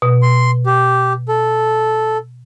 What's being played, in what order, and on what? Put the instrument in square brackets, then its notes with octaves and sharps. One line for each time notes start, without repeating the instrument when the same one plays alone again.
[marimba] B2
[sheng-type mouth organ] C6
G4
A4